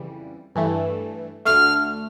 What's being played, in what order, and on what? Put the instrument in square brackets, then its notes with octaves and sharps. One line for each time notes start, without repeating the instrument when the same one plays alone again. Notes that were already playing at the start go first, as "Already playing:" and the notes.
Already playing: [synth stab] F2 C#3 E3 G3
G2 E3 A3
[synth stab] D2 D3 A3 [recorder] F6